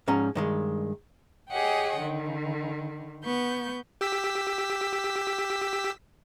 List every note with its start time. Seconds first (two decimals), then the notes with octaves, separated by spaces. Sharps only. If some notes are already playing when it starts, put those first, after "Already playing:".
0.08 G#2 F3 C#4 A#5
0.35 G2 D#3 G#3
1.51 G4 G#4 C#5 D#5 F#5 G5
1.98 D3 D#3
3.24 B3 C#6 G6
4.01 G4 E6 B6